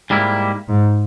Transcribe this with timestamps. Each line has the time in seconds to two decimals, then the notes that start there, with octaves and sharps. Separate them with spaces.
0.10 G#2 G3 A#3 E4
0.68 G#2